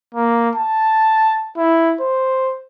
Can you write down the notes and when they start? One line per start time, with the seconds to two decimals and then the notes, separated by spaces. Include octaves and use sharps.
0.15 A#3
0.55 A5
1.57 E4
2.01 C5